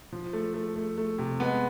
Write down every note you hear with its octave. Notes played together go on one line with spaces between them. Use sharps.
F3
A3
A3
A3
A3
C3
G#3 B3